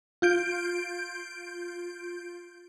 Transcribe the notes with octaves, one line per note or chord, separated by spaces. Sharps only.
F4 G6 D7